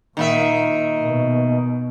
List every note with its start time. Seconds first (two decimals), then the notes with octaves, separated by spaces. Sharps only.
0.17 A#2 D#3 A#3 E5
1.01 B2